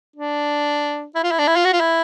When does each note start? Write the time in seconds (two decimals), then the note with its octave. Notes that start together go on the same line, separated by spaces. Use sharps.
0.16 D4
1.15 E4
1.23 F4
1.31 E4
1.39 D4
1.47 E4
1.56 F4
1.65 F#4
1.73 F4
1.80 E4